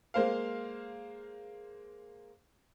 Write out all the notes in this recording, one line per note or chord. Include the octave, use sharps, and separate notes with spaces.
G#3 A#3 C5 F5